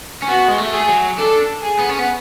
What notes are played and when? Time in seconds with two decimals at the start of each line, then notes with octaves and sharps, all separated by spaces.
0.22 C#4
0.29 B3 F#4
0.48 G#3
0.58 A3
0.73 G#4
0.89 F#3
1.18 D4 A4
1.63 G#4
1.79 B3
1.89 C#4
1.99 B3